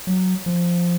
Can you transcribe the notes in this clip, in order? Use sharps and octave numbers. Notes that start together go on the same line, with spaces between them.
F#3
F3